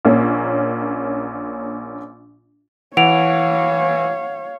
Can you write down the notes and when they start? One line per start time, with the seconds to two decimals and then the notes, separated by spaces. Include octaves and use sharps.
0.05 A#1 A#3 C#4
2.97 E3 C#5 F5 F#5 D7 F7